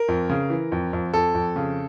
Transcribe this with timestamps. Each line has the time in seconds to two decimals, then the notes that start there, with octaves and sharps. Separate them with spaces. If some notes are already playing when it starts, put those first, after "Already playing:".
Already playing: A#4
0.08 F2
0.30 C#3
0.50 E3
0.72 F2
0.93 F2
1.13 F2 A4
1.34 F2
1.56 C#3